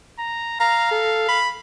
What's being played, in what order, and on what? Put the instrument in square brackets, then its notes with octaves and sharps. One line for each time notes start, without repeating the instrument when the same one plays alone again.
[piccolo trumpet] A#5
[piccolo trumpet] F5 [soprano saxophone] A#5
[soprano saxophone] A4
B5